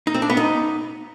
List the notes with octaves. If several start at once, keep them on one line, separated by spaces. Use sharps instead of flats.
D#4
C4
D4
B3
D#4